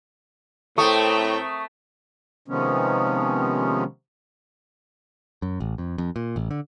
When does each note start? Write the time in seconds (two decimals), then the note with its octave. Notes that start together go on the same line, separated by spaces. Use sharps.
0.78 A2 A3 C4 A#4 G5 C#6 D#6
2.48 C3 D#3 F3 G#3 B3 C#4
5.42 F#2
5.60 A1
5.78 F2
5.98 F2
6.16 A#2
6.36 A1
6.51 D3